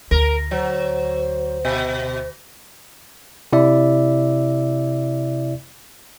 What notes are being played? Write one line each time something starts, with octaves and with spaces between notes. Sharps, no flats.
D2 A#4
F#3 C5
B2
C3 E4 D5 E5